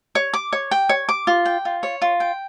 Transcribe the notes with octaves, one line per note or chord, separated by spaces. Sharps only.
C#5
D6
C#5
G5
C#5
D6
F4
G5
F4
C#5
F4
G5